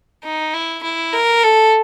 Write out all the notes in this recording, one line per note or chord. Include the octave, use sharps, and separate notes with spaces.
D#4
E4
E4
A#4
A4